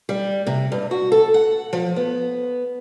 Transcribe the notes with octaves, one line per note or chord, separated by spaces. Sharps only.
G3
C3
G2
F#4
A4
F#5
F3
B3